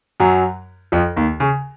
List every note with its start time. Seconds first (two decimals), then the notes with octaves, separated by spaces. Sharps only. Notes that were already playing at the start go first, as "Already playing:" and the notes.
0.20 F#2 F#3
0.92 F2 F3
1.16 D#2 D#3
1.40 C#3